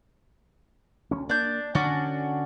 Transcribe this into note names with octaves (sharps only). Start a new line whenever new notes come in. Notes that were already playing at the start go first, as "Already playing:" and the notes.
D2 G#3 C#4
A#3 D4 G6
D3 C#4 D4 F#4